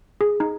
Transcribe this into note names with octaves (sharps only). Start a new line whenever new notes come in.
G#4
D#4